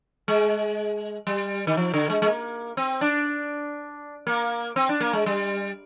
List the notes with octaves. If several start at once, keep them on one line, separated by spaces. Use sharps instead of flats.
G#3
G3
D#3
F3
D3
G#3
G#3
A#3
C4
D4
A#3
C4
D4
A#3
G#3
G3